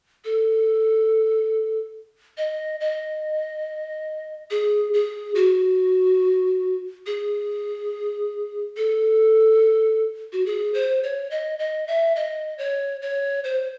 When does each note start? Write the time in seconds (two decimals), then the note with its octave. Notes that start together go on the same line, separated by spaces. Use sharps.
0.25 A4
2.38 D#5
2.81 D#5
4.51 G#4
4.94 G#4
5.35 F#4
7.06 G#4
8.77 A4
10.33 F#4
10.46 G#4
10.74 C5
11.03 C#5
11.31 D#5
11.59 D#5
11.88 E5
12.16 D#5
12.58 C#5
13.02 C#5
13.44 C5